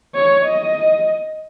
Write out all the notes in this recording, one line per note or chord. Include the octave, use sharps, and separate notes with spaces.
C#5
D#5